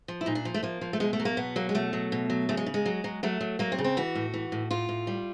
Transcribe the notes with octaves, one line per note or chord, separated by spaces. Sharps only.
F3
E4
A#2 D#4
D4
F3
A3
F3 A#3
F3
A3
B2 G#3
A3
F#3
A#3
B2 B3
F#3 A#3
G#3
B2 A3
F#3
B2
F#3
C#3 A3
G#3
C#3
G#3
F#3
F#3
F#3 A3
F#3
F#3 A#3
C4
C#3
C4
E3 F#4
A2
E3
A2
A2 F4
A2
G3